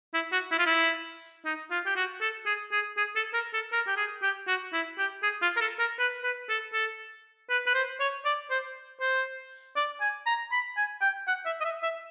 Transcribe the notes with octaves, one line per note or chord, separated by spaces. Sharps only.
E4
F#4
E4
F4
E4
D#4
F4
G4
F#4
A4
G#4
G#4
G#4
A4
A#4
A4
A#4
G4
G#4
G4
F#4
E4
G4
G#4
F4
A#4
A4
A#4
B4
B4
A4
A4
B4
B4
C5
C#5
D5
C5
C5
D5
G#5
A#5
B5
G#5
G5
F#5
E5
D#5
E5
E5